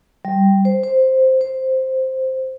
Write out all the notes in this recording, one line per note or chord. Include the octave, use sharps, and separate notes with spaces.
G3
C5
C5
C5